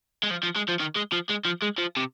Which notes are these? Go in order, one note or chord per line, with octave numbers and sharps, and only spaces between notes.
G#3
F3
F3
G#3
F3
D#3
G#3
F3
G#3
F3
G#3
F3
C3